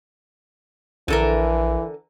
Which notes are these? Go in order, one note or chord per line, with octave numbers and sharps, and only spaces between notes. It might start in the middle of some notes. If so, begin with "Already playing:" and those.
A#1 D3 E3 A4 A#4